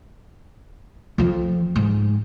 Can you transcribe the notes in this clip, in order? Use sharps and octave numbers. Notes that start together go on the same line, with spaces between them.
F2 F3
G#2